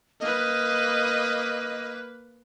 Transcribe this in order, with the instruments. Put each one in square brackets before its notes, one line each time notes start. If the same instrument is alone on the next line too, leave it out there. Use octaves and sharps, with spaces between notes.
[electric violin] A#3 B4 [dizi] D#5